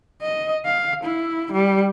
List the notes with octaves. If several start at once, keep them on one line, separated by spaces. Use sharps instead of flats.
D#5
F5
E4
G3